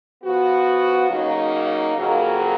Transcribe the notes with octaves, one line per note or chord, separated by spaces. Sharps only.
F3 B3 F#4
C#3 F#3 A#3 D#4
F2 C#3 F#3 A#3